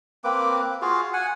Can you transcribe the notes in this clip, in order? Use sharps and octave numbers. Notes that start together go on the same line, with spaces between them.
A#3 C4 B4 D6
F4 F#4 G#4 F5
F#5 G#5